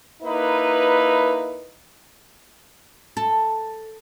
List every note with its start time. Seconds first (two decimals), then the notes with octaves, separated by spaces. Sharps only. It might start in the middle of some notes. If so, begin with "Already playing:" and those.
0.22 A#3 D#4 E4 B4
3.17 A4